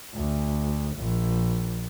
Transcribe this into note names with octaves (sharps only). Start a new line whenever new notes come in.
D2
A#1